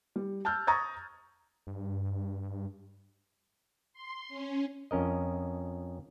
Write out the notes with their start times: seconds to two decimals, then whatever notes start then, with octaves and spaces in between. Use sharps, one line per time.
0.16 G3
0.45 A5 E6 F6 G6
0.67 A#5 C#6 D#6 G#6 A6
1.67 G2
3.93 C6
4.29 C#4
4.91 F2 C#4 A#4 D#5